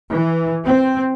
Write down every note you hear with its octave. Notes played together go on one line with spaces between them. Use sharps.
E3
C4